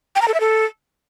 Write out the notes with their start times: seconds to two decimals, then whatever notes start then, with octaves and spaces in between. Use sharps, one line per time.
0.16 G5
0.22 A#5
0.28 A4
0.34 E5
0.40 A4